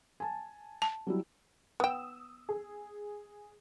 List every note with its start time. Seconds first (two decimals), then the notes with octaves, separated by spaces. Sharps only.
0.20 G#5 A5
0.82 A5
1.07 F#3 G3 E4
1.80 B3 G5 D#6 E6 E7
2.49 G#4